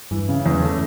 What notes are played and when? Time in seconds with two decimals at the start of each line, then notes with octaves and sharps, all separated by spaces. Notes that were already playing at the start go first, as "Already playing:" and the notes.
0.11 G2 E3
0.29 C#3
0.46 E2
0.63 A3